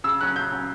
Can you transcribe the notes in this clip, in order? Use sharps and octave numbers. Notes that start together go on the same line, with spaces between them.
C#3 E6
F#3 C#4 F#6
C#3 G6
F#3 C#4